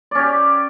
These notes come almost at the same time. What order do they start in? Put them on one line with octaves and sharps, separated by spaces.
D5 C#4 G4